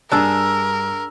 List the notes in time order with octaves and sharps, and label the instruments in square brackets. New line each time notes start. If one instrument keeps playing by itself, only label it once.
[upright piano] G2 E6 [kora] D4 G#4 D5 [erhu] A#4